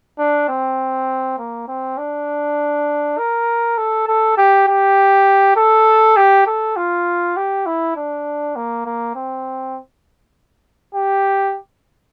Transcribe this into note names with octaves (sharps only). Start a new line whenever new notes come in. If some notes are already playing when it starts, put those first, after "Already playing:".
D4
C4
A#3
C4
D4
A#4
A4
A4
G4
G4
A4
G4
A4
F4
G4
E4
D4
A#3
A#3
C4
G4